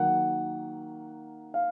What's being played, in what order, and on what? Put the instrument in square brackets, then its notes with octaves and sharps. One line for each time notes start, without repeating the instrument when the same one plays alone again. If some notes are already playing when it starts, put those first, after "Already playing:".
Already playing: [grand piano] D#3 F#3 A#3 F#5
F5